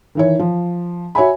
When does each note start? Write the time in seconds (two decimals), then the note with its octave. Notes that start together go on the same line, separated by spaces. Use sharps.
0.15 D#3 E3 C#5
0.39 F3
1.15 F#4 C#5 E5 G#5 B5